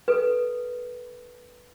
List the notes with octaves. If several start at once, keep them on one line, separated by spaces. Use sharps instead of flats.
A4 B4